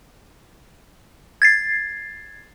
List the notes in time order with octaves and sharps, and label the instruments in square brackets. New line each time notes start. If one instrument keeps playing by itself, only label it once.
[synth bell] G#6 A6 C7